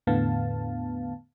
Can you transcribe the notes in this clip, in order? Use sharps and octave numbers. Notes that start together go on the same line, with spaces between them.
E2 A2 D3 B3 F5 A5